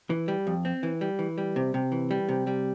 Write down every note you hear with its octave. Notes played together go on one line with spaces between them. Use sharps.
E3
G3
F2
C4
E3
G3
E3
G3
C3
C3
E3
G3
C3
G3